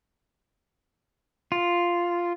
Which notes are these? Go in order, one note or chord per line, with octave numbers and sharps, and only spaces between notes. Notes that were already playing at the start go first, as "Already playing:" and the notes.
F4